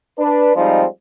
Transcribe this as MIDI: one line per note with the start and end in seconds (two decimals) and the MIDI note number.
0.19 0.55 62
0.19 0.55 71
0.56 0.85 53
0.56 0.85 55
0.56 0.85 56
0.56 0.85 60
0.56 0.85 63
0.56 0.85 65